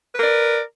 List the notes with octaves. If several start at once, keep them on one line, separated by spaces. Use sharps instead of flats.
A#4 B4 D5